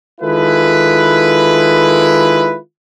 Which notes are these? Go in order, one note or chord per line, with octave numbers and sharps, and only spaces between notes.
D#3 G#3 E4 F4 A4 B4